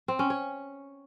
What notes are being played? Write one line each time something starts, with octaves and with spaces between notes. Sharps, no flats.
C4
C#4
C#5